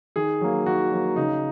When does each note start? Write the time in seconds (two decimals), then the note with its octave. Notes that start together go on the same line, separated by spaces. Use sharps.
0.16 D#3 G#4
0.41 F#3 A#3
0.66 D#3 F#4
0.91 F#3 A#3
1.16 C#3 D#4